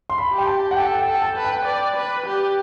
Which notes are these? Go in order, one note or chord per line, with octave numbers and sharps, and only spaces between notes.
C6
B5
G4
G5
A5
F#5
A4 G5
G5
A4
A5
B4
G5
D5
B4
G4